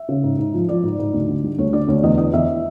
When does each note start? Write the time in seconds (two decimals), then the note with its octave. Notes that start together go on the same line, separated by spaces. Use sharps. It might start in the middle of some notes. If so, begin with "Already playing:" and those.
Already playing: E5
0.09 C#3
0.24 G#2
0.39 G#2
0.54 F3
0.68 F3 D5
0.83 G#2
0.99 G#2
1.14 D2
1.28 D3
1.44 G3
1.58 D2 C#5
1.73 D3 D5
1.88 D2 C#5
2.03 E2 D#5
2.18 E2 D#5
2.33 E2 E5